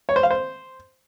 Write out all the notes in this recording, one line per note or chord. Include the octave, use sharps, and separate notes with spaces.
C#5
C5
F5
C5